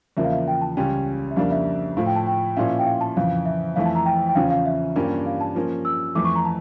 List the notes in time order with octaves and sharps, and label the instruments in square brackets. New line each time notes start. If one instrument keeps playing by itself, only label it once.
[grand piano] E2 C#3 F3 A#3 [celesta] E5
[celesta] F5
E5
G5
A5
[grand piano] C#2 C#3 G3 C#4 [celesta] G5
[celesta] E5
[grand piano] F2 C#3 G3 A#3 D4 [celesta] F5
[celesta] E5
[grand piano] A2 F3 A3 [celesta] F5
[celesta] G5
A5
G5
[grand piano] A#2 F3 C#4 E4 [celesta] F5
[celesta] G5
F5
A5
[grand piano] F2 C#3 E3 [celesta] F5
[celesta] E5
[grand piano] F2 E3 A3 E4 [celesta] F5
[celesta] A5
A#5
G5
G5
[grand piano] E2 C#3 F3 C#4 [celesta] F5
[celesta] F5
E5
[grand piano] G2 F3 A#3 C#4 G4
[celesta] F5
A5
[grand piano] F3 A#3 C#4
[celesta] E6
[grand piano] F2 E3 A3 [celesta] D6
[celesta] C#6
A#5
A5